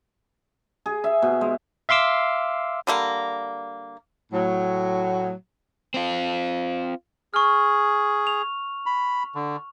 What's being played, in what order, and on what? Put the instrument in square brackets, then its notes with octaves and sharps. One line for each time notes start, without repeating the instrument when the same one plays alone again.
[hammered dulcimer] G#4
E5
B2
G#3
[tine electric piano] E5 F5 C6 D6 E6
[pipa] D3 G3 A#3
[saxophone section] A2 F#3
[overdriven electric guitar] C4 F4
[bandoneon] G#4 [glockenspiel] C#6 F6
[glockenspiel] F7
[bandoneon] B5
D3